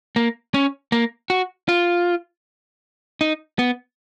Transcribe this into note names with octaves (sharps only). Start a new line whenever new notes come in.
A#3
C#4
A#3
F#4
F4
D#4
B3